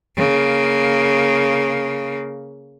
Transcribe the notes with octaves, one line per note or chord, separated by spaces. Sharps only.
C#3 A#3